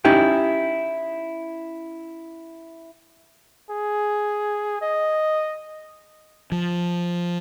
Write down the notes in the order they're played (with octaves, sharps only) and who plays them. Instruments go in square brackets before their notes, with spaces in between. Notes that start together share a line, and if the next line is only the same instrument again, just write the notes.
[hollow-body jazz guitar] C#4 D#4 E4 G4 G5
[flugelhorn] G#4
D#5
[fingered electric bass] F3